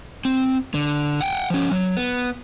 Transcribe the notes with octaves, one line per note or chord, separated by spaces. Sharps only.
C4
D3
F#5 G5
F3 C#4
F#3
B3